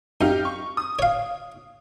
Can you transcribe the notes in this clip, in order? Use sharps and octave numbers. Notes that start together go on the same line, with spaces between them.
F#2 D#4 G4 F5
C#6
D#6
C#5 F5